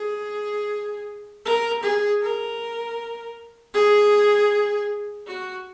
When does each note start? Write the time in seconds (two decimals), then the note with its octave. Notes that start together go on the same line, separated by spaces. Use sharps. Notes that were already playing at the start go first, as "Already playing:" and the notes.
Already playing: G#4
1.45 A#4
1.83 G#4
2.22 A#4
3.74 G#4
5.27 F#4